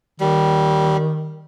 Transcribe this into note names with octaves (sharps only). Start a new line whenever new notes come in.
D#3 G3